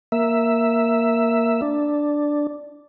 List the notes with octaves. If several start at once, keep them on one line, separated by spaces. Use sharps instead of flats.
A#3 E5
D4